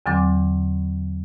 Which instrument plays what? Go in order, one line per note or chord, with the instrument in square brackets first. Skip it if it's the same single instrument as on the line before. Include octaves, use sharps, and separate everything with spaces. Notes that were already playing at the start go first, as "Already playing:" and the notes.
[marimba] E2 D3 F#3 C4 D6